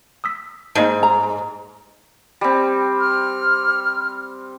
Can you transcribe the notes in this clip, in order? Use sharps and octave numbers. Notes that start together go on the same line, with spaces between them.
D#6 E6 B6
G#2 A#3 D#5 A5
A#5
G3 C4
F6